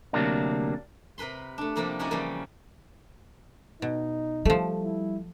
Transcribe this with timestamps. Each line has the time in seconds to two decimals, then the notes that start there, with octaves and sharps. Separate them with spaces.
0.13 D2 C3 F#3 A#3 D4
1.18 C3 A#4 B4 B5 C6
1.58 A3 D4
1.76 C3 F3 G3 A#3 A4 A#4
1.99 C#4 D#4 E4 F#4 D5 F#5
2.11 C#3 E3 F3 G3 A#3
3.82 B2 D#4
4.45 F3 G3 A3
4.82 E4